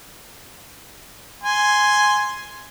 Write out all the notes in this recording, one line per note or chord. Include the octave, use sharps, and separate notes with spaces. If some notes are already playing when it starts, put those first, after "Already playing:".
G#5 C6